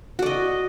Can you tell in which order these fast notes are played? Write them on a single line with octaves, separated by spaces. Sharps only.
F#4 D5 D#5